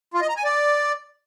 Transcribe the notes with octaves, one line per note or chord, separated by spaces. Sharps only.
F4
D#5
A#5
G#5
D5